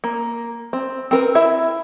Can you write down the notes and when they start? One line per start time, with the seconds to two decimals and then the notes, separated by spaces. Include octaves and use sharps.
0.04 A#3
0.73 C4
1.11 C4 A#4 B4
1.35 E4 E5